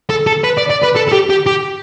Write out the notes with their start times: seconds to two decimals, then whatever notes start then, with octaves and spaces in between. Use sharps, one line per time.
0.10 A4
0.27 A4
0.44 B4
0.57 D5
0.70 D5
0.82 B4
0.95 A4
1.08 A4
1.12 G4
1.29 G4
1.46 G4